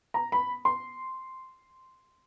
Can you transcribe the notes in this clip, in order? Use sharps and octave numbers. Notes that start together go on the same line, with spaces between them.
A#5
B5
C6